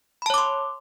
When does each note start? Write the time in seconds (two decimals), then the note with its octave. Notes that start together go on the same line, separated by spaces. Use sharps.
0.22 B5
0.26 A5
0.30 C#5
0.34 D6
0.38 C6